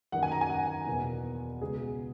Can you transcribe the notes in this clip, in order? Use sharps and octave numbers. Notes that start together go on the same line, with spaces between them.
F#2 D#3 A#3 F#5
G#5
A#5
G#5
F#5
E2 B2 A#3
C#2 B2 G#3 G#4